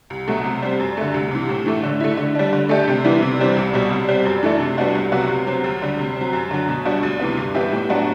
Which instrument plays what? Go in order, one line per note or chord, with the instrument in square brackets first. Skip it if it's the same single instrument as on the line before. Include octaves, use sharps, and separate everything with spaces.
[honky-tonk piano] C2
B2 F#3 A3
C3
G3 C4
F#2
D3 A3
C2
C3 E3
A2
E3 A3
D3
A3 E4
D3
G3 D4
D3
A3 D4 G4
C3
E3 G3 B3 E4
C3
E3 G3 C4
C2
B2 G3
C3
G3 C4
F#2
E3 A3 D4
C3
G3 B3 D4 F#4
C2
C3 F#3 B3 F#4
C3
F#3 C4
D2
D3 G3
C3
F#3 C4
F#2
D3 F#3
B2
G3 D4 F#4
D2
C3 E3 B3
G2
E3 B3 E4 G4
A2
F#3 B3 D4 F#4